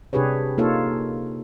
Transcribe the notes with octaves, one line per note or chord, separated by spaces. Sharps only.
C3 D4 G4 G#4 B4 C#5
A#3 D#4 F4 A4 C#5 F5